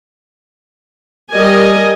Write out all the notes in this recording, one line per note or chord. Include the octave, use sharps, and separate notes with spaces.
G3 A#4 D#5 G#5